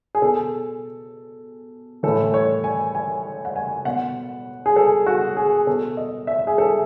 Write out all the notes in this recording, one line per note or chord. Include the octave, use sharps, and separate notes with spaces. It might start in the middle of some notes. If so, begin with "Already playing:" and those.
G#4
B2 A4
A2 E3 A4
C#5
G#5
G#5
F#5
G#5
B2 F#5
G#4
A4
F#4
G#4
B2 A4
D#5
E5
G#4
A4